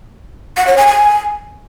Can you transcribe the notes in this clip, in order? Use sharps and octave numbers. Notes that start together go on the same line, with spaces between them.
F#5
C#5
G#5
G#5